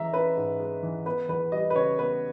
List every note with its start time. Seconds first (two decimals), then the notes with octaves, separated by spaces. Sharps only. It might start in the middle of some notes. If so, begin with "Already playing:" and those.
Already playing: E3 G#3 C#4 E5 A#5
0.13 C#4 B4
0.37 G#2
0.60 G#3
0.83 E3
1.05 B3 B4
1.29 E2 B4
1.52 G3 D#5
1.70 B4
1.75 C#3 C#5
1.99 B3 B4